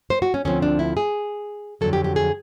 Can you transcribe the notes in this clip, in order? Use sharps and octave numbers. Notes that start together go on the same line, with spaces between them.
C5
F#4
C#4
D2 D3 F3 A3 C4 C#4
D4
E4
G#4
F2 D3 F#3 A4
G4
G4
G#4